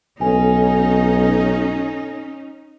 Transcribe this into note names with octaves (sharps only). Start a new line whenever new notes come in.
B1 C#4 D#4 A4 G#5